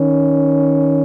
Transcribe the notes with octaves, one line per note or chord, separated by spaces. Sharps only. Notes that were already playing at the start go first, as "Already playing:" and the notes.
Already playing: D#3 C#4